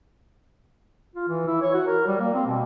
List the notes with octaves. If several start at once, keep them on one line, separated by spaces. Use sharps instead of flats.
F4
E3
E4
C#5
F#4
A#4
G3
A#3
C4
B2